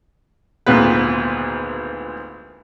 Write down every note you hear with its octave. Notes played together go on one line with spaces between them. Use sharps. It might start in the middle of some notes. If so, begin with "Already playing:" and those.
G#1 D2 A#2 B3 B4